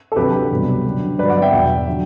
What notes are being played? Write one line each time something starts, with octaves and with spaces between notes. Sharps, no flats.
A4
D2 C3 F#3 G4 B4
C2 B2 F#3
F#2 D3 F#3
G2 D3 F#3 B4 D5
D5 F#5
E5 G5
E2 B2 F#3
D3 F#3